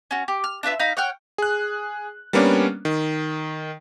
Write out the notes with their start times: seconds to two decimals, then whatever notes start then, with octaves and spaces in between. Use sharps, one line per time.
0.11 C#4 F#4
0.28 G4
0.44 F6
0.63 D4 F4 B4 E5
0.79 D#4 F5 A#5 B5
0.97 C#5 F#5 G5 F6
1.38 G#4 F#6
2.33 G3 A#3 B3 C#4 D4
2.85 D#3